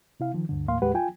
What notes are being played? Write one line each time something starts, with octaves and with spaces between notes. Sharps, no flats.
C3 E4 F5
D#3 F3
D2 G2 D3
D#2 A2 A#3 F5 C6
D#2 A2 G#3 G4 B4 F#5
F4 G5 G#5